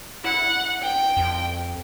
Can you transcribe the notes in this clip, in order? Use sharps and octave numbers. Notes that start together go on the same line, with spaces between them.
E4 F#5
G5
F2